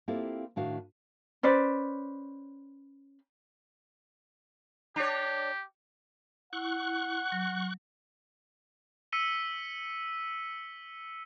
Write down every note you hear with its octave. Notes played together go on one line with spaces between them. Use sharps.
A#3 C4 E4 F4 G4 A4
A2 D#3 D4 E4 F#4 F5
C#4 B4 C5 D5
D4 G4 C#5
E4 F#5 C#6 F#6
F#3
E6 B6 C#7 D#7 G7